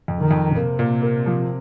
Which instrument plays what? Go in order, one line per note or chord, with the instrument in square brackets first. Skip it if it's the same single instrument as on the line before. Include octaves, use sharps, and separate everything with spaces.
[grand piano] F2
[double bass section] D#3
[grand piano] F2
[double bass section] C3 [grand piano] A#3
[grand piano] A#2
A#3
F3